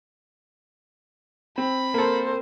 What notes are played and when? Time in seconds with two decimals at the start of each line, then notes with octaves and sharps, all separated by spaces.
1.58 C4 B5
1.94 A#3 A4 A#4 C5